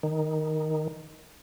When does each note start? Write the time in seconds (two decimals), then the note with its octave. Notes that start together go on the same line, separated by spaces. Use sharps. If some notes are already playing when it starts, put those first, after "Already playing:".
0.03 D#3